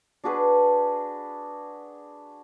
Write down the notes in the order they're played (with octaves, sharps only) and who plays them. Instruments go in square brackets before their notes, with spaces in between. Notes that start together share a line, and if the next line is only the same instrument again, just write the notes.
[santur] D4 F#4 G#4 B4